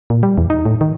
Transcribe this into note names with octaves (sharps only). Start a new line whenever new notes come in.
A#2
G3
E2
D#4
A2
D#3